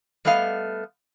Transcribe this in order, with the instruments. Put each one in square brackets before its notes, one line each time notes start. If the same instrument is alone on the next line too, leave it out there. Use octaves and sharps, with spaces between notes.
[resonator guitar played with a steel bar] G3 A3 B3 D#5 F5